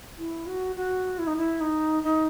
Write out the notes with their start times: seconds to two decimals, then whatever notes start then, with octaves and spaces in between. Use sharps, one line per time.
0.18 E4
0.47 F#4
0.76 F#4
1.18 E4
1.27 D#4
1.37 E4
1.61 D#4
2.03 D#4